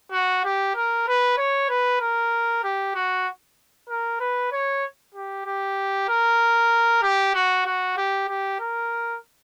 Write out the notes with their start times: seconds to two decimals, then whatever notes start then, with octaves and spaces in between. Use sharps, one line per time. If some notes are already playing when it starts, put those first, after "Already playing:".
0.12 F#4
0.44 G4
0.75 A#4
1.07 B4
1.38 C#5
1.69 B4
2.01 A#4
2.64 G4
2.95 F#4
3.89 A#4
4.20 B4
4.52 C#5
5.15 G4
5.45 G4
6.09 A#4
7.02 G4
7.34 F#4
7.66 F#4
7.97 G4
8.28 G4
8.60 A#4